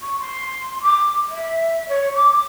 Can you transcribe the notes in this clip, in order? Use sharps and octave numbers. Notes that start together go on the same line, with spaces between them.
C#6
C6
D6
E5
C#5
D6